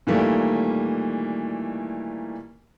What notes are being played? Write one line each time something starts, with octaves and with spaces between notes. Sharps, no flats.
A#2 D#3 E3 G3 A3 A#3